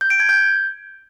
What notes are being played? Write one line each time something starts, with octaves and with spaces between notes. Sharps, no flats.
G6
D7
G#6
G6